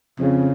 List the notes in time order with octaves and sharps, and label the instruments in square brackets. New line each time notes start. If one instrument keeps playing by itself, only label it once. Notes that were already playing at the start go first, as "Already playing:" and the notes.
[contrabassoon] F2 [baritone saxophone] C#3